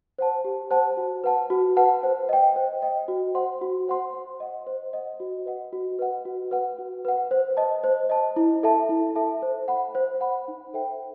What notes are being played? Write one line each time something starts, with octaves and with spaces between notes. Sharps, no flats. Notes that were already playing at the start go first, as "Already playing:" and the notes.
C5 F#5 A5
G4
C5 F#5 A5
F#4
B4 F#5 A5
F#4
B4 F#5 A5
C5
D#5 G5
C5
D#5 G5
F#4
C5 F#5 C6
F#4
C5 F#5 C6
C5
D#5 F#5
C5
D#5 F#5
F#4
B4 D#5 F#5
F#4
B4 D#5 F#5
F#4
B4 F#5
F#4
B4 F#5
C5
D#5 A5
C5
D#5 A5
E4
A4 E5 A5
E4
A4 E5 A5
C5
F#5 B5
C5
F#5 B5
D#4
A4 C5 E5 G5